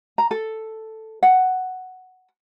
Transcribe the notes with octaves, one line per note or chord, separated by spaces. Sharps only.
A#5
A4
F#5